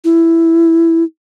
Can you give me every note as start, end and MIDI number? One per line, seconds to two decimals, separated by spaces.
0.04 1.04 64